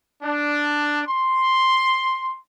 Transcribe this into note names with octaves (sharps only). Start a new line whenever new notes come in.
D4
C6